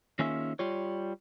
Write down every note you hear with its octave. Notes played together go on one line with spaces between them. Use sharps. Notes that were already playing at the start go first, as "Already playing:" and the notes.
D#3 A#3 C#4 F4 G#4 E5
G3 F4 C#5